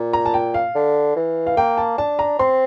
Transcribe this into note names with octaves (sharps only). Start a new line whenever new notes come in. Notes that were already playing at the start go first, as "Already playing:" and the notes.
Already playing: A#2
A#5
A5
G5
F5
D3
E3
F5
A#3 G5
A5
D4 A5
A#5
C4 C6